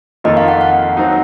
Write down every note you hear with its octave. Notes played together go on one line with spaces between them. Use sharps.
F2 D#3 A#3 F4 A4 D#5
F5
F#5
F#5
F#3 C4 D#4